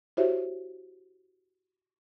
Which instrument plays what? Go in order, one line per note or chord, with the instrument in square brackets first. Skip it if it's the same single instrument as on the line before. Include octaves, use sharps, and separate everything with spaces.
[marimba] E4 F#4 G4 C5 C#5 E5